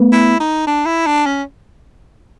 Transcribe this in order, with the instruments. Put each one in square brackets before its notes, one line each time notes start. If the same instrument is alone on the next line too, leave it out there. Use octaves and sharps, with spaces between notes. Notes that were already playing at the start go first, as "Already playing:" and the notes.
Already playing: [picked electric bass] A3 B3
[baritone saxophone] E4
D#4
D4
E4
D4
C#4